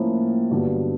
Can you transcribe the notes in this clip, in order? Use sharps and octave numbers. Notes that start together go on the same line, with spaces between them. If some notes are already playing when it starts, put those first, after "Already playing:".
Already playing: A2 F3 A#3 C#4 E4
G2 D3 F#3 B3